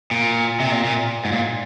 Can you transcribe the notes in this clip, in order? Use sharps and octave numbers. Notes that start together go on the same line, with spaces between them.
A#2
C3
A#2
A#2
G#2
A#2